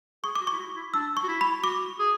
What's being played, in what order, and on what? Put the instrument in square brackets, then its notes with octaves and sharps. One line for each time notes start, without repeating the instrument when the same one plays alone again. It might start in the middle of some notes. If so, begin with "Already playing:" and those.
[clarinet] G#4 [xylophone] C#6
[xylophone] D6
[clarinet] F#4
[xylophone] C#6
[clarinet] E4
F#4
E4
[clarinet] D4 [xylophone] E6
[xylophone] C#6
[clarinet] F#4
E4
[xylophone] B5
[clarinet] F#4 [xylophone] D6
[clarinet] G#4